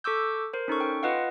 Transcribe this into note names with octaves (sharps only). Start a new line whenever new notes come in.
A4 C#6 D6 E6 G6
A#4 C5
C#4 D#4 A4 C#6
G5
F4 B4 D#5 F5 F#5